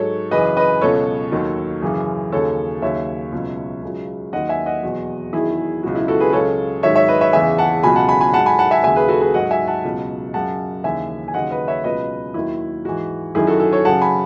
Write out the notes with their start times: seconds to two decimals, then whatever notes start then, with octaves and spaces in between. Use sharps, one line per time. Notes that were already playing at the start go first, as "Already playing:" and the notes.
Already playing: G#2 F#3 A4 C#5
0.31 F#2 C#3 E3 B4 D#5
0.57 B4 D#5
0.81 C#2 B2 F#3 A4 C#5
1.32 D#2 D#3 F#3
1.82 F#2 C#3 E3
2.32 D#2 C#3 F#3 A4 C#5
2.82 D#2 C#3 F#3 C#5 E5
3.32 C#2 B2 F#3
3.82 C#2 C#3 F#3
4.33 D#2 D#3 F#3 D#5 F#5
4.49 E5 G#5
4.66 D#5 F#5
4.83 E2 B2 F#3
5.33 E2 D#3 F#3 E4 G#4
5.83 C#2 B2 F#3 F#4
5.95 E4
6.08 F#4 A4
6.20 G#4 B4
6.33 C#2 C#3 F#3 A4 C#5
6.83 G#2 D#3 F#3 C#5 E5
6.96 C#5 E5
7.08 B4 D#5
7.21 C#5 E5
7.33 E2 C#3 E3 E5 G#5
7.58 F#5 A5
7.83 C#2 B2 F#3 G#5 B5
7.96 F#5 A5
8.09 G#5 B5
8.21 G#5 B5
8.34 G#2 F#3 F#5 A5
8.46 G#5 B5
8.59 F#5 A5
8.71 E5 G#5
8.84 D#2 C#3 F#3 E5 G#5
8.96 G#4 B4
9.08 F#4 A4
9.21 G#4 B4
9.34 G#2 F#3 D#5 F#5
9.51 E5 G#5
9.67 F#5 A5
9.84 C#2 B2 F#3
10.34 F#2 C#3 F#3 F#5 A5
10.84 D#2 C#3 E3 E5 G#5
11.28 G#5
11.34 D#2 C#3 F#3 D#5 F#5
11.51 B4 D#5
11.68 C#5 E5
11.84 C#2 B2 F#3 B4 D#5
12.34 D#2 D#3 F#3 E4
12.85 G#2 E3 F#4
13.35 F#2 D#3 F#3 E4 G#4
13.47 F#4 A4
13.60 F#4 A4
13.72 A4 C#5
13.85 F#2 C#3 F#3 F#5 A5
14.02 G#5 B5